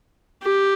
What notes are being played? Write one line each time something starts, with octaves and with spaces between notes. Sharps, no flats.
G4